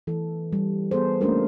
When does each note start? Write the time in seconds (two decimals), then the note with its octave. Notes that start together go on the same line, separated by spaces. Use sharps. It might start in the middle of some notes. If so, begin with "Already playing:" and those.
0.07 E3 A4
0.53 G3
0.91 B3 G#4 A4 C5
1.21 A3 A#3 C#4 D4 F#4 A#4